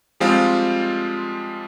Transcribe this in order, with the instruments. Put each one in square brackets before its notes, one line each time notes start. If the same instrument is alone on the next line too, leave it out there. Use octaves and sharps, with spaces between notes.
[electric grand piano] F3 G3 G#3 C4 F4